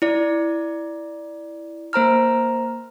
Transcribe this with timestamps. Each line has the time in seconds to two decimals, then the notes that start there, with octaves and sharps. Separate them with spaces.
0.02 E4 D5
1.93 A#3 C5 A#5 F6